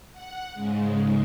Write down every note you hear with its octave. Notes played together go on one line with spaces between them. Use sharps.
F#5
G#2 C#3 G#3